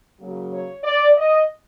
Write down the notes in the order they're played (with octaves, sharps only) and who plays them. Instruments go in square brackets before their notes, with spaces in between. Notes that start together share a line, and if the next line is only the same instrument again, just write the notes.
[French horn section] C#3 F#3 A#3
C#5
D5
D#5